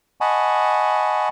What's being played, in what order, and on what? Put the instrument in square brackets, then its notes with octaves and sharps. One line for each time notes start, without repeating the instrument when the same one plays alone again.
[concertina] D#5 F#5 G#5 A5 B5 C#6